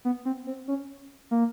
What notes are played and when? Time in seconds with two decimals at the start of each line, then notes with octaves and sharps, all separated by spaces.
0.05 B3
0.25 C4
0.47 C4
0.68 C#4
1.31 A#3